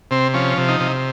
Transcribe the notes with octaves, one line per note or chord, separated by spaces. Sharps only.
C3 C4
F3 C#4
C3
D#4
C3